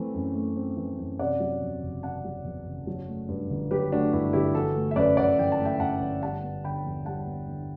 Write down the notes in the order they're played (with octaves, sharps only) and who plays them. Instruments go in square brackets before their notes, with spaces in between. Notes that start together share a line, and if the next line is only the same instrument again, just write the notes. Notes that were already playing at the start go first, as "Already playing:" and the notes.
Already playing: [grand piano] E3 A3 C4
F#2
A3
C4
E3
F#2
C3 D5 F#5
F#3
E2
F#1
C3 F#5 A5
F#3
E2
F#1
F#3
A3
G2
G1
F#3 G4 B4
A3 D4 F#4
G2 E4
G1 E4 G4
E3 F#4 A4
A3
E5
F#2 B4 D5
G1 D5 F#5
E3 G5
A5
A3
E5 G5
F#2 F#5 A5
G1
G3 F#5 A5
B3
D3 G5 B5
E2
G3 F#5 A5
B3
D3